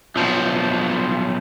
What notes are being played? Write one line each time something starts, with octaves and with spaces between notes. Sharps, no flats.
B1 F3